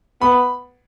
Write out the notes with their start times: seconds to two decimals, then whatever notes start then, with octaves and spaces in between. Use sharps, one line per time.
0.21 B3 B5